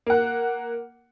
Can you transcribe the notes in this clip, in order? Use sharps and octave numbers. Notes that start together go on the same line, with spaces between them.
A#3 F#5